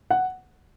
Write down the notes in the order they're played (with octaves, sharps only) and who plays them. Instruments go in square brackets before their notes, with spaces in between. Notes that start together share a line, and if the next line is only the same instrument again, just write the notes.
[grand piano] F#5